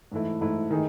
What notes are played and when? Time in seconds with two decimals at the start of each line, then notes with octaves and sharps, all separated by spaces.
0.12 G#2 E3 A3 E4
0.41 G#2 E3 A3 E4
0.71 D#3 A3 D#4 G#4